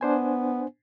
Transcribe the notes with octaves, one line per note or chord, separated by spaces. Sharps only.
B3 D4 C5 G#5